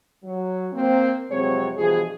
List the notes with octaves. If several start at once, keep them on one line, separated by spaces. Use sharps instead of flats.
F#3
A#3 C4
F2 C3 F#3 G#3 C4 C#5
G2 B2 E3 F3 G#4